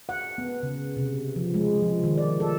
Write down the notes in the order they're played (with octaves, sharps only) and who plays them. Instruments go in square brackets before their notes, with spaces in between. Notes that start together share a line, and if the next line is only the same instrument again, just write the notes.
[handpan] F#5
B3
C#3
C3
F3
G#3
F3
D#3
D5
A4